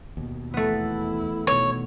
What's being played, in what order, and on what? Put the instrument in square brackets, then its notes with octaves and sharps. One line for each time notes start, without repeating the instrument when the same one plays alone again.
[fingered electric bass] D#2 B2
[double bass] E2 E4 [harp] A3 B3
[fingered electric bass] B2 D#3 [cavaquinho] C#5